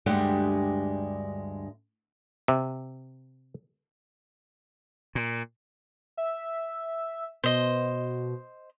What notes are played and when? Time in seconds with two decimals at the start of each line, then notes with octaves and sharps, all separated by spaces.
0.06 D2 G2 G3 G#3 G4 F#5
2.48 C3
5.15 A#2
6.17 E5
7.44 B2 C5 D#5